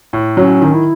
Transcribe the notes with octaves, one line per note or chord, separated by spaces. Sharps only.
A2
F#3 C#4
D#3
E4